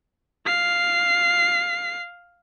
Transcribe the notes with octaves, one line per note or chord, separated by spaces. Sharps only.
F5 C7